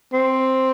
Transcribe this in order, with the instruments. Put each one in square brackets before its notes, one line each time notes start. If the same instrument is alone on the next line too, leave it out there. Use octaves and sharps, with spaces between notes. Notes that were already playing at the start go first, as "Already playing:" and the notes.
[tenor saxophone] C4